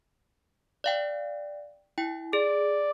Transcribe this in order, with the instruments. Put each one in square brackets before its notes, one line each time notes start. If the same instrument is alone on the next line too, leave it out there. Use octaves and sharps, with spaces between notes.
[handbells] D5 F5 G5
E4 G5
[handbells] G#4 [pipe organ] D5